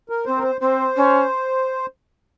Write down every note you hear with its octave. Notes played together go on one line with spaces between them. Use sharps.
A#4
C4 C5
A#4
C5
C4 C5
C#4